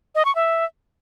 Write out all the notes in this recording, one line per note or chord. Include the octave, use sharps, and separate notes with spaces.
D#5
C#6
E5